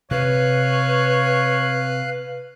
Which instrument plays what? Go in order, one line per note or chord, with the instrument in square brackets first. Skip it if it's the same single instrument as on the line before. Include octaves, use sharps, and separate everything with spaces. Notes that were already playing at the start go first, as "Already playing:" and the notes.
[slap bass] C3 [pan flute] B4 [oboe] C#5 [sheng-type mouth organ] F5 F#6